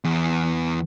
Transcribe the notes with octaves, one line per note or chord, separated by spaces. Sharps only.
E2